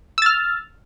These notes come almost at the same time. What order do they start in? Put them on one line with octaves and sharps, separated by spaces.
E6 A6 F6